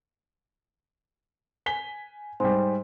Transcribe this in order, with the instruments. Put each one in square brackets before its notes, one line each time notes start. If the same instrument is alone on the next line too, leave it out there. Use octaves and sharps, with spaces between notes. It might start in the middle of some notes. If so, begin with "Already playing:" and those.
[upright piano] G#5 B6 G7
[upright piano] G#2 G3 [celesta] C5 G#5 C6